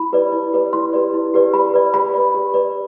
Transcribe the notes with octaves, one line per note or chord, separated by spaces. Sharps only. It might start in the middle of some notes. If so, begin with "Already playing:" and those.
Already playing: E4 B5
G4 B4 D5
E4
G4 B4 D5
E4 C6
G4 B4 D5
E4
G4 B4 D5
G4 B5
B4 D5
G4 B5
B4 D5
G4
B4 D5